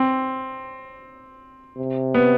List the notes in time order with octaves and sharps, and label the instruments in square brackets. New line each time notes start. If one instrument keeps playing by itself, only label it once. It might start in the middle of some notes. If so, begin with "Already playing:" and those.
Already playing: [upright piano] C4
[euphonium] C3
[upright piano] B3